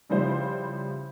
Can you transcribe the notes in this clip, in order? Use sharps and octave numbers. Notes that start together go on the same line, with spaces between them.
C#3 F3 G3 E4 C5